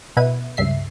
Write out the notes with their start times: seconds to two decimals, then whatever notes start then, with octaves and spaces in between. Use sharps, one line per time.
0.17 B2 E4 B4 D#7
0.57 C#2 G2 E5 C7